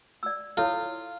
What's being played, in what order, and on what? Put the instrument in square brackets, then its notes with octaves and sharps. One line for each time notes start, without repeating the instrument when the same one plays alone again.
[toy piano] D5 E6
[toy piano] E4 A4 C#5 [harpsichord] F4